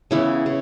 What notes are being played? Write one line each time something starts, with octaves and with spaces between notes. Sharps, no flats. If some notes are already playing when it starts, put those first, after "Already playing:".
C#3 E3 B3 E4
C#3